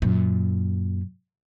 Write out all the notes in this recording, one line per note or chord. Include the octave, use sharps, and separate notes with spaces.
F#2 A#2